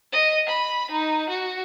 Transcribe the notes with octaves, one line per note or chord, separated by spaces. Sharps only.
D#5
B5
D#4
F#4